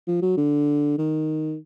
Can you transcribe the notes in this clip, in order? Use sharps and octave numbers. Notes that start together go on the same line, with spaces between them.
F3
F#3
D3
D#3